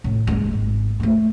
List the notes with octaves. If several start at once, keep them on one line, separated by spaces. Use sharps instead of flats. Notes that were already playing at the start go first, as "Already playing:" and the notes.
A2
F#1 G#3
G#1
G#3 A3